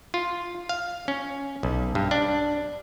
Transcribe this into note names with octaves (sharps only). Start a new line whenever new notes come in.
F4
F5
C#4
B1
G2
D4